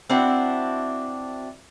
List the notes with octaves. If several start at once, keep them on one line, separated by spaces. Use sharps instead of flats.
C4 D4 E4 F#4